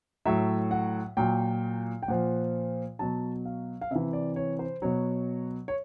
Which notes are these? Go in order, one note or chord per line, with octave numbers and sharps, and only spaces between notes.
A2 F#3 E5
F#5
A#2 F#3 G5
G5
A#2 F3 F#5
B2 F#3 A5
F5
F5
C3 E3 E5
D5
C#5
C5
B2 F#3 C#5
C#5